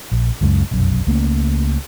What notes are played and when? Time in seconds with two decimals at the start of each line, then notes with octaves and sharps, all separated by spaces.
0.12 A#1
0.41 C#2 F#2 C#3 G#3
0.71 F1 B1 F#2
1.07 C#2 A3 A#3 C#4